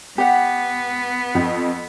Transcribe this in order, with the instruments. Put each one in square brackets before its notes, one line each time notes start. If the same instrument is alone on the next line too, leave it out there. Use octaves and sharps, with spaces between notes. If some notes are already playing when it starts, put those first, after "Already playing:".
[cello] B3 [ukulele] G4 F#5
[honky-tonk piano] F2